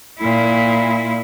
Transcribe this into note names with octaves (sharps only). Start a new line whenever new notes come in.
A#2 E4